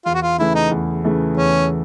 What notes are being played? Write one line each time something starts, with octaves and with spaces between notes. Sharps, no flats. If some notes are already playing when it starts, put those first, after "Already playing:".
E2 F4
F#4
F4
C#3 E3 A3 E4
D#4
E2
C#3 E3 A3
E2 C#4